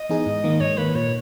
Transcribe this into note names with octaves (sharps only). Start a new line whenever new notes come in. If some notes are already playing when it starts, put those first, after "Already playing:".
Already playing: D#5
E3 B3 D#4 G#4
G#2
D#3 A#3
G#2 C#5
D#3 A#3 B4
A#2 C#5